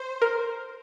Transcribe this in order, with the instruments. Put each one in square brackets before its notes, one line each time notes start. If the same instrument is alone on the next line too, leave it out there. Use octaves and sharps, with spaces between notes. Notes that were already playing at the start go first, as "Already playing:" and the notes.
Already playing: [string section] C5
[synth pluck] A#4